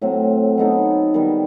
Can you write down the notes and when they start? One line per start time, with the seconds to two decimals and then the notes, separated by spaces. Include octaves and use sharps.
0.01 A2 F#3 C4
0.58 F#3 B3 D#4 A4
1.14 D#3 G3 B3